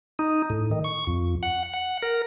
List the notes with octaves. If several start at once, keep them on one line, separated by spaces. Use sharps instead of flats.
D#4
A2
D#3
C#6
F2
F#5
F#5
A#4